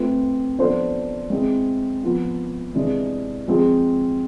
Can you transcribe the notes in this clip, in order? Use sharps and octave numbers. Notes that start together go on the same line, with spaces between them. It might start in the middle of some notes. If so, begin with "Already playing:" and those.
Already playing: A3 C4 F4 B4
F3 B3 D4 A4 C5
G#3 C4 E4
F3 B3 F4
C3 E3 G#3 D4
F3 G#3 C4 F4 G#4